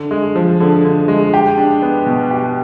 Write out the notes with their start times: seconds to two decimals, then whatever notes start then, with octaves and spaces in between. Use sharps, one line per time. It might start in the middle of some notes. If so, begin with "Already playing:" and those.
Already playing: D3
0.11 G#3
0.36 F3
0.60 D3
0.84 D3
1.08 G#3
1.34 G4
1.58 D4
1.82 B3
2.06 B2
2.31 G4